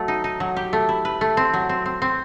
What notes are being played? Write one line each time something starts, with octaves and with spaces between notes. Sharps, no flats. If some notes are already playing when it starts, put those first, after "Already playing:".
Already playing: F#3 A3
D#4
D#4
F#3
G4
A3
E4
B4
A3
C4
F#3
C4
C4
C4